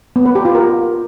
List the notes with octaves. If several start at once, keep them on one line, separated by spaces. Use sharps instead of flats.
B3
B4
G4
F4
A#4